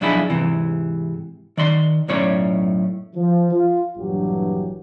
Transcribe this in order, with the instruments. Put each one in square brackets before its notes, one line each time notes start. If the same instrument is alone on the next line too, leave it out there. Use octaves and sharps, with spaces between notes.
[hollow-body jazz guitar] B1 F2 D4 E4 G#4 B5
G#2 C3 E3
D#3 D5 C6
B1 F#2 A2 C#4 C#5 D5
[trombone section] F3
F4
A#1 G2 E3 F#3 G4